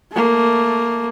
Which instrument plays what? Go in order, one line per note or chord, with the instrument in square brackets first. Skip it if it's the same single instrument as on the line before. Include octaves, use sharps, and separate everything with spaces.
[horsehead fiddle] A3 A#3